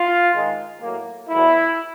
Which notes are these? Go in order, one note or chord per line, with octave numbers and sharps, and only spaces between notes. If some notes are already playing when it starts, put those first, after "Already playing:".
Already playing: F4
G#2 D#3 G#3
A2 F#3 A#3
E2 B2 F#3 A3 E4